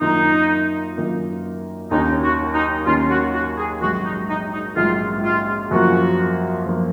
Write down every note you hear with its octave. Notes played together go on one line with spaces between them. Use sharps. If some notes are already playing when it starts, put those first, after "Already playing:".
F#2 D#3 A#3 D#4 F4
F#2 D#3 A#3 F4
D#2 D#3 A#3 C#4 D#4
F#4
D#4
D#2 D#3 A#3 C#4 F4
F#4
F#4
G#4
A#1 G#2 F#3 F#4
D#4
D#4
D#4
A#1 G#2 F#3 F4
F4
F#2 F3 A#3 F4 F#4
F#2 F3 A#3 F4